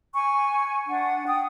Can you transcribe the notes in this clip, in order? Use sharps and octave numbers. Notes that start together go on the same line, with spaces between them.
G#5 C#6
D4 F#5
G5 D#6